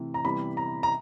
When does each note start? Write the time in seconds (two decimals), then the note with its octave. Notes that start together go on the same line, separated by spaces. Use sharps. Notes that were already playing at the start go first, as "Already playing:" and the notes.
Already playing: C3 E3 A3
0.14 A#5
0.24 C3 E3 G3 B3 B5
0.57 A#5
0.83 A#5